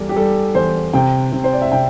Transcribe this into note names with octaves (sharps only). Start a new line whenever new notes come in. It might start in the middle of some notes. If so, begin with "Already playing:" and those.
Already playing: E2 G3 A4
G4
G3 A4
E2 C5
C3 G5
C3
C5
D5
E5
C3 G5